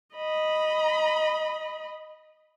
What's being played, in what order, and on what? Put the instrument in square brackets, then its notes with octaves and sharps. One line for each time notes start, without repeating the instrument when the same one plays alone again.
[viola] D#5 B5